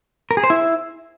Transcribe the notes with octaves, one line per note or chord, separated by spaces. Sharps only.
A#4
G#4
C5
E4